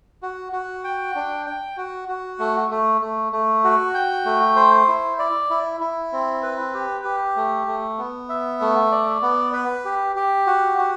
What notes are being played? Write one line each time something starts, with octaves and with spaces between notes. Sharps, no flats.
F#4
F#4
G5
D4
G5
F#4
F#4
A3
A3
A3
A3
F#4
G5
A3
C5
E4
D5
E4
E4
C4
B4
G4
G4
A3
A3
B3
E5
A3
D5
B3
B4
G4
G4
F#4
F#4